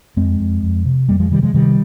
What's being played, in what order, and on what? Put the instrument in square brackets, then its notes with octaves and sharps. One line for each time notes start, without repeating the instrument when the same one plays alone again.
[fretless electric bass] F2 G#3 C4
F2
F2
C3
F2 G3 A#3
F3 G#3
C3 D#3 G3
F3 G#3
C3 D#3 G3